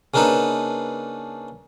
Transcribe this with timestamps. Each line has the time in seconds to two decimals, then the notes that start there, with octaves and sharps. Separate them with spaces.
0.14 C#3 A#3 D4 D#4 A4 B4